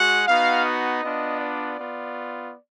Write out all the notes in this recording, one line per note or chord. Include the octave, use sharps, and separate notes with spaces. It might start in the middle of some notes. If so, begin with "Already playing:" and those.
Already playing: G#3 F#4 F#5
B3 D#4 F#4 F5
D#5
B3 D4 F4
D5
B3 F4